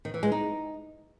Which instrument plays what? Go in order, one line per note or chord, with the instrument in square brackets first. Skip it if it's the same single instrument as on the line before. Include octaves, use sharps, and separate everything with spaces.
[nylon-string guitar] D#3
E3
G#3
D#4